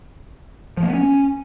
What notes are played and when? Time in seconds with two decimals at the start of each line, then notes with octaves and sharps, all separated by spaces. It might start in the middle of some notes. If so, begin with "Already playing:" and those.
0.77 F3
0.83 A#3
0.88 B3
0.94 C#4